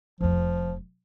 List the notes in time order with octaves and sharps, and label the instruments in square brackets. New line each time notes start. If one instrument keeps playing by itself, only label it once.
[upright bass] F1 F2 [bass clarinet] F3